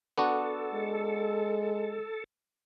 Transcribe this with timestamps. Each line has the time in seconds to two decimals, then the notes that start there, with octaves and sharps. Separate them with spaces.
0.18 B3 D4 F#4 A4
0.74 G#3